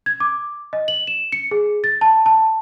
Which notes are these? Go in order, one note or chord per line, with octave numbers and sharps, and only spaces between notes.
G#6
D6
D#5
F#7
E7
C#7
G#4
A6
A5
A5